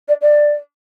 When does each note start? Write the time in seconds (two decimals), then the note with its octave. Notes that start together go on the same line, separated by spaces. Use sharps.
0.08 D5
0.21 D5